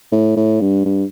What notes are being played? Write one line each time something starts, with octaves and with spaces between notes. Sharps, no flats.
A2
A2
G2
G2